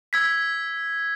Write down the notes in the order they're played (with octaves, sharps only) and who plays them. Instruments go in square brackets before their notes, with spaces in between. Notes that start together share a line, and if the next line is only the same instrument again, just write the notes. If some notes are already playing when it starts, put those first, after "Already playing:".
[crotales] E6 G#6 B6